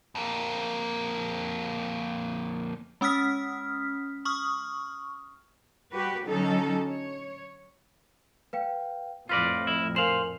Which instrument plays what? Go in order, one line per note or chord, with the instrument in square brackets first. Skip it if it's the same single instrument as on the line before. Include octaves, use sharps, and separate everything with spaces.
[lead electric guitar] F2 A#3
[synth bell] G#3 C#4 D#6 F6 B6
C#6 D#6 F6
[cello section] G3 F#4 G4 B4
D3 F#3 C#4 D#4 A4
C#5
[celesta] B4 F5 G5
[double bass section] F2 A2 [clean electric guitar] F4 B4 D5 [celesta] F6 A#6
[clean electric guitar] E4
[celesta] A#4 G#5 F#7 [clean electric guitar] C5 F5